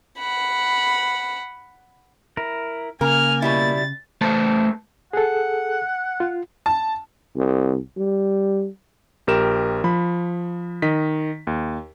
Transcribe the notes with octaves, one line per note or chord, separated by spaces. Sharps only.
F#5 B5
E4 A#4
C#3 A#3 A#4 G#5 F6
B2 G3 E4 A6
A3 B4 C5 A5
G#4 A4 F#5
F4
A5
C2
G3
A#1 G4 A#4 E7
F3 B5
D#3 D#5 B6
D#2